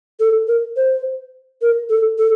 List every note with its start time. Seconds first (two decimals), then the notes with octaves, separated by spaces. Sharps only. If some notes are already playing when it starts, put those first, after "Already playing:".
0.20 A4
0.48 A#4
0.77 C5
1.62 A#4
1.90 A4
2.18 A4